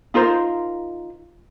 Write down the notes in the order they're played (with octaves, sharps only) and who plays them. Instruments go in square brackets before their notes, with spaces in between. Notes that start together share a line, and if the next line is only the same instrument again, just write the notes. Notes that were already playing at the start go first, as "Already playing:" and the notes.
[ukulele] D#4 F4 A#4 C5